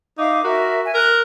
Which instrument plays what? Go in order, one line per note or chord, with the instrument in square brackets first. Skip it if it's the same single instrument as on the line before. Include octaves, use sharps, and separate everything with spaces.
[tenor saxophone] D#4 [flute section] E5 F5 D6
[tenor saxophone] F#4 [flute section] A#4 E5
[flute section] E5 G#5
[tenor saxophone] A#4 [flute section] F#6